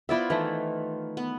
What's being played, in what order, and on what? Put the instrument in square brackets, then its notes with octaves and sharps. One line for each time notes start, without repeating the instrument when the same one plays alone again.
[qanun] B3 F4 C5 [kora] E4 D5 E5
[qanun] D#3 [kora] E3 A3
[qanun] B3